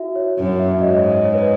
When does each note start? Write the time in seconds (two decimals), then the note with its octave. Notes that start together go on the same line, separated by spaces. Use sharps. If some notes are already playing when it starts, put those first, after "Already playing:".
Already playing: E4 F#4 E5
0.16 C#5
0.38 F#2
0.59 E5
0.81 G#2 D#5
0.88 C#5
0.95 D#5
1.24 C#5
1.34 B4